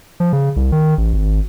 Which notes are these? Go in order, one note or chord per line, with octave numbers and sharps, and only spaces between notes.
F3
C#3
C2
D#3
A1
G#1